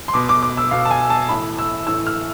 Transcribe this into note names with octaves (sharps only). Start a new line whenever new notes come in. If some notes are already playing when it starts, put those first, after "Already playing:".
C6
B2 D6
D6
D6
E6
B2 F5
A5
G#5
A5
A2 E3 B5
E6
A2 E3 E6
F6